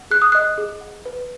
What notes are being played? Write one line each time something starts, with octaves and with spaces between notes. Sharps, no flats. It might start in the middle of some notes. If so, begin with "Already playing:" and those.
Already playing: F#5
G#4 F#6
D#6
D#5 F#6
G#4
F#5
B4